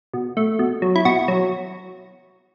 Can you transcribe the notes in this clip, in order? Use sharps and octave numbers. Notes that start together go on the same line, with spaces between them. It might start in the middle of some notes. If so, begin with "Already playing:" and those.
B2
A3
B2
F#3
E4
B2 F#4
F#3